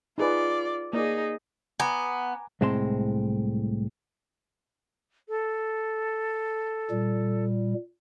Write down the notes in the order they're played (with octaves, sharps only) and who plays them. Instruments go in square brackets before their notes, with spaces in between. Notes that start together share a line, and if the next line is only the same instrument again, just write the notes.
[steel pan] D#4 G#4 B4 [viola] F4 D5
[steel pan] A#3 D5 [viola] D#4 G#4
[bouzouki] B3 [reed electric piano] G#5 A#5 D6
[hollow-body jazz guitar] C2 A2 G#3 C4 A5 C6
[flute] A4
[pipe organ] A#2 G3